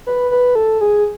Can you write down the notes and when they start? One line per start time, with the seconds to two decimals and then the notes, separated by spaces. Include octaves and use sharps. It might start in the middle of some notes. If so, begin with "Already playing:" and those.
0.07 B4
0.31 B4
0.55 A4
0.81 G#4